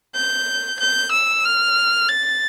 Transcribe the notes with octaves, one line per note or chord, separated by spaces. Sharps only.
G6
G6
E6
F6
A6